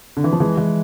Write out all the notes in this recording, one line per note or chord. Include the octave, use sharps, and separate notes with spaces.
D3
E3
F3
E3 G#3
E3 G#3